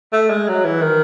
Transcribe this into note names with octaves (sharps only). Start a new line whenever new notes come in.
A3
G#3
F#3
E3
D#3